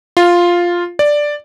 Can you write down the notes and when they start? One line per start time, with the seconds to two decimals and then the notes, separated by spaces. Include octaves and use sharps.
0.17 F4
0.99 D5